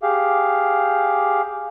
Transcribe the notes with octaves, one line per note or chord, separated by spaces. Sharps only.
G4 G#4 F5